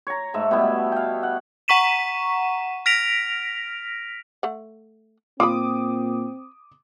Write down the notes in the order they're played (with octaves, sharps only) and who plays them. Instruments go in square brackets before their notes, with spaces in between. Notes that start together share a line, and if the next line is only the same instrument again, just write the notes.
[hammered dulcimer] C#5 A#5
G#2 A3 E5
B2 G3 B3 E4
F5 G5
F#5
[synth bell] F#5 A#5 C#6 B6 D#7 E7
F6 A#6 B6 D7 F7
[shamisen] A3 F#5
[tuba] A#2 [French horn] C4 [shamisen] F4 B5 [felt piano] D6 D#6